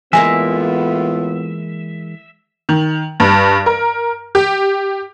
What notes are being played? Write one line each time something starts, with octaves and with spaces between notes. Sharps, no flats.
A2 E3 G#3 A#3 B3 F4 E5 G#5
D#3
G2
A#4
G4